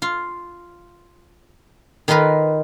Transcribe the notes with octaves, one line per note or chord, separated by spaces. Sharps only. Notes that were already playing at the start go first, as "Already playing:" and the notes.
F4
D#3 D#4 F4 A#4 B4